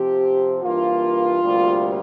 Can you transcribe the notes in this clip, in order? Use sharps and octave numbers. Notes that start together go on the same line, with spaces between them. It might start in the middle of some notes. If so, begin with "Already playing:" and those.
Already playing: C3 F3 C4 G4
G2 E3 A#3 F4
D2 C3 G3 A#3